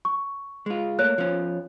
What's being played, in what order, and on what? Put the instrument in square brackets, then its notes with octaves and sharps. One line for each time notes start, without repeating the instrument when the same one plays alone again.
[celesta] C#6
[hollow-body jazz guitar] G#3 F4
[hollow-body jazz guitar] A3 A#3 [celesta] C#5 F#6
[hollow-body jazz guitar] F3 C#4